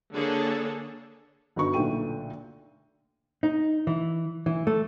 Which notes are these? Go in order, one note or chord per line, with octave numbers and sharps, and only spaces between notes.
D3 A#3 D4 G#4 A4 C#5
G1 D3 D#4 F#4 B4 C#6
B1 A#2 D3 A3 G5 D#7
D#4
E3
E3
A3